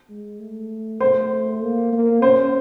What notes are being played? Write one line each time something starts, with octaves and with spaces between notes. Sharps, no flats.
G#3
A3
A3 C5
A#3
A#3
C#4 C5